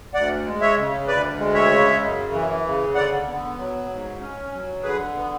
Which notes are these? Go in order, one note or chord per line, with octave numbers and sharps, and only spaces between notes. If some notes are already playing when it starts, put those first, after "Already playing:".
D2 D5 F#5
G#3
C#5 E5
C#3
D2 B4 D5
G#3
C#5 E5
C#3
F#2
E3
C#3
D3 D5 F#5
B3
F#3
G#2
C#4
F#3
D3 G#4 B4
B3